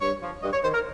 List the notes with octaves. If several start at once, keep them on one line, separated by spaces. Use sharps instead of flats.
G2 C#5
F3
G2 D#5
C#5
D#3 C5
A#4